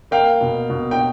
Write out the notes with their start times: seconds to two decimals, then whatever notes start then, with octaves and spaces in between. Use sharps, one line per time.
0.11 A#3 F5 G5
0.41 B2
0.70 B2
0.91 G5